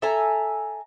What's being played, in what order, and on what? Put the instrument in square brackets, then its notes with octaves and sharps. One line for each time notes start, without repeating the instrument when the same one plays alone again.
[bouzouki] A4 E5 G#5 A#5